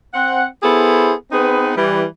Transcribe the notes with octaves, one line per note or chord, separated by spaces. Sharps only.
C4 F#5
B3 E4 G#4 A4 C5
B3 C4 D#4 G#4 B4
E3 G3